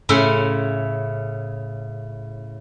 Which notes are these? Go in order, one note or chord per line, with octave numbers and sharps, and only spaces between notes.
A2 C#3 C#4 E4 C6